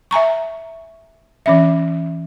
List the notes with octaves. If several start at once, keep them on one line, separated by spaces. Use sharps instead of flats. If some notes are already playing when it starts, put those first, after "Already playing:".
E5 G#5 A#5 C#6
E3 C#4 E5